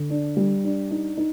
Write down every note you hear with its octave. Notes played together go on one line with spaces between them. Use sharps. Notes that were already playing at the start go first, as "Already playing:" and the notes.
Already playing: D3
D4
G3
D4
D#4
D#4